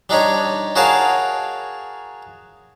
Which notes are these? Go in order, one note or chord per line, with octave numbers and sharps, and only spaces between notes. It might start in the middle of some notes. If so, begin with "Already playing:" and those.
G3 D4 D#4 G4 C#5
F#4 G#4 A#4 C#5 F5 A5